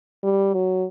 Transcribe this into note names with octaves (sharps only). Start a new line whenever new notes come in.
G3
F#3